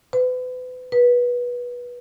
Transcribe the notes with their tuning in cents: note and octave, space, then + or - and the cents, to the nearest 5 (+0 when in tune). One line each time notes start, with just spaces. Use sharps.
B4 +35
B4 -20